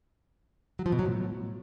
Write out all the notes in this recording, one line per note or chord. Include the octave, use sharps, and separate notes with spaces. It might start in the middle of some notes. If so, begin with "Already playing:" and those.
F#3
F3
B2
F#3
A2